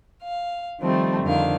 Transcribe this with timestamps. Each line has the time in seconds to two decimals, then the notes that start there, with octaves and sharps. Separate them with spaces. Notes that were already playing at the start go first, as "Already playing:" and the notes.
0.24 F5
0.81 D#3 F3 G3 A3 C4
1.24 F2 D3 D#3 F5